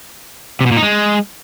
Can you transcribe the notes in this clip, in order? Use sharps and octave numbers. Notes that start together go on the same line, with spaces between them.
C3
B2
A#2
D#4
G#3